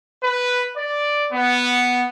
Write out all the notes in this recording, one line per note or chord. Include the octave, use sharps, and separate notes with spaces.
B4
D5
B3